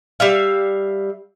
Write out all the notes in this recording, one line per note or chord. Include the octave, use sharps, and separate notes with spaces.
G3 E5 F5